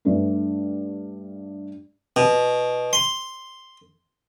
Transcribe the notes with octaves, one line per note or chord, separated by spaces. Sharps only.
G2 A3
B2
C6